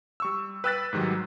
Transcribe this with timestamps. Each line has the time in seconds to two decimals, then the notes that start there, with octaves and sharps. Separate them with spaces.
0.20 G3 C#6 E6
0.64 B4 G5 E6 F#6 A6 B6
0.93 G#2 D#3 F#3 G3